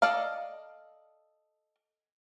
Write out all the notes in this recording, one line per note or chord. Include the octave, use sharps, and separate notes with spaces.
A4 D5 D#5 F5